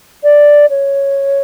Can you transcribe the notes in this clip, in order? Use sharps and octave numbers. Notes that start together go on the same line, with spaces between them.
D5
C#5